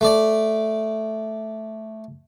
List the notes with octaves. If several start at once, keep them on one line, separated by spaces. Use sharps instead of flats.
A3 D5